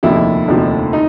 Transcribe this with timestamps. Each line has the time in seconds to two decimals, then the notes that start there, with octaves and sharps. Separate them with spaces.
0.03 F1 D#2 D3 F3 E4
0.48 F1 D#2 D3 F3
0.93 D#4